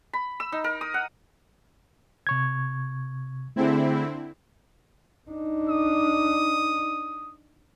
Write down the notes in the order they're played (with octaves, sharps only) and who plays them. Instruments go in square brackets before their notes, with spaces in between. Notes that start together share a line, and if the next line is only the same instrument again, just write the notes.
[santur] B5
E6
D#4
A#4
D#6
F#5
[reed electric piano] C3 C#6 G#6
[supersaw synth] D3 C4 E4 [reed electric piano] A3 G#4
[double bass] D4 D#4
[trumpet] D#6